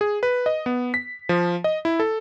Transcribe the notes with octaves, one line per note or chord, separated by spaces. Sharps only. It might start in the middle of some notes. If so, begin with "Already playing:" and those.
G#4
B4
D#5
B3
B6
F3
D#5
E4
A4